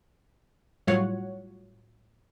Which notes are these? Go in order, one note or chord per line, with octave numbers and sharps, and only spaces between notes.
A2 F#3 G3 F4 C#5 F#5